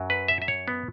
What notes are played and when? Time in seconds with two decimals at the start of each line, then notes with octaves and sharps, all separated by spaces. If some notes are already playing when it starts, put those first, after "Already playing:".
Already playing: F#2 F#3
0.10 B4
0.28 E5
0.42 E5
0.48 C#5
0.68 B3